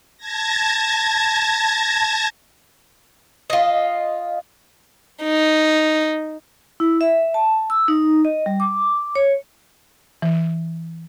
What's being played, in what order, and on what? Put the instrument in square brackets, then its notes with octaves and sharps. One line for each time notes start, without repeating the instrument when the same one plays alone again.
[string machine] A5 G#6 A#6
[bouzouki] F4 D#5
[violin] D#4
[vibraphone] E4
E5
A5
E6
D#4
D#5
G3
D6
C#5
[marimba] E3